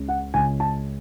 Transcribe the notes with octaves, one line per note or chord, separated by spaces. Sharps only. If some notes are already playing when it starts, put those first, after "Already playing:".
Already playing: C#2 C#3 G#3 C#4
F#5
C#2 C#3 G#3 C#4 G#5
A5